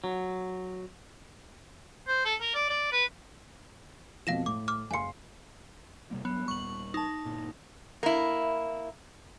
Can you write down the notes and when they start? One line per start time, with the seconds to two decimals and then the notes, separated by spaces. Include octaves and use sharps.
0.04 F#3
2.07 C5
2.25 A4
2.41 A#4
2.54 D5
2.70 D5
2.92 B4
4.27 F2 B2 F3 F5 A#6 E7
4.46 A2 D6
4.68 D6 F6
4.91 F#1 F5 G#5 C6 C#7
6.11 C3 G3 A#3
6.25 G2 F#3 B3
6.48 D#1 G3 C#6 F#7
6.94 D#4 A5
7.25 G1 A#2
8.03 A#3 E4